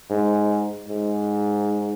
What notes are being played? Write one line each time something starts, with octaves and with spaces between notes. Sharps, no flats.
G#2
G#2